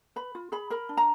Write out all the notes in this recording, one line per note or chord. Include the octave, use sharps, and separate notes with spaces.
B4 B5
F4
G#4 B5
A#4 B5
D4
A#5